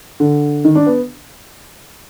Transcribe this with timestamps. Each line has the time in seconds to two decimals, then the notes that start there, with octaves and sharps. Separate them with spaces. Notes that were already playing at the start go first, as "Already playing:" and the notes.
0.20 D3
0.65 D#3
0.75 D4
0.86 B3